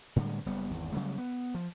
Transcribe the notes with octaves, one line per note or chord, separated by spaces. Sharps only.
A2 D3 G3 G#3
F#1 G3 B3
G#1 E2
C#3 F#3 G3 A3
B3
F3